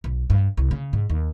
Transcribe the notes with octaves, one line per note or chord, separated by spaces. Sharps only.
B1
G2
C2
C#3
G#2
D#2